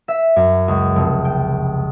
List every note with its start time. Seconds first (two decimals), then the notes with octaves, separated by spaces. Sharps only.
0.08 E5
0.36 F#2
0.68 C#2
0.96 F1
1.25 G5